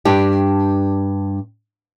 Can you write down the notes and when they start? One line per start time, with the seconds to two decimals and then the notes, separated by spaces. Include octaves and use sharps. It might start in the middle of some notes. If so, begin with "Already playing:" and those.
0.05 G2 D4 G4